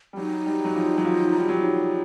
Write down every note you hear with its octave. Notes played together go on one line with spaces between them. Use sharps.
G3
F#3 D#4
G3
F#3
F3
F#3
F3
G3
F#3